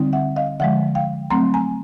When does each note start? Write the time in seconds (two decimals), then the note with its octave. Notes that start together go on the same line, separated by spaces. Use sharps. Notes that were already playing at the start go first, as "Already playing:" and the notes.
Already playing: D3 G3 C4 D#4
0.13 E5 F#5
0.36 D#5 F5
0.60 D3 F3 G#3 E5 F#5
0.95 F5 G5
1.31 F#3 A3 C4 A#5 C6
1.54 G#5 A#5